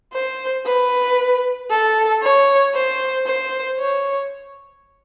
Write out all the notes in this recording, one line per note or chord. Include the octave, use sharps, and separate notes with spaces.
C5
B4
A4
C#5
C5
C5
C#5